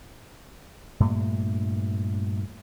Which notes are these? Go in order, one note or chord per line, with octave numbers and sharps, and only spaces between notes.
G2 A#2 A3